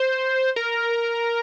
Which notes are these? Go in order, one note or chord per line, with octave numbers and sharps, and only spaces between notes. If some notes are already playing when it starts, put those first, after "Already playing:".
Already playing: C5
A#4